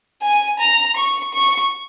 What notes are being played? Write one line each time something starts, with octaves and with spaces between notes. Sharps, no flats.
G#5
A#5
C#6
C#6